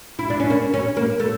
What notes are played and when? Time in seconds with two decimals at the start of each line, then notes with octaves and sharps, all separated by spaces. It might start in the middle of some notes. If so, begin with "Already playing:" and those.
0.19 E4
0.30 D4
0.40 C#4
0.50 A#3
0.74 C#4
0.97 A#3
1.20 A3